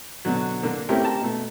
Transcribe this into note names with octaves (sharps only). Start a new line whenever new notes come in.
B2 D3 F#3
D3 A#3
A3 C4 C#4 E4 G4 A#4
G4 A5 A#5
B2 A3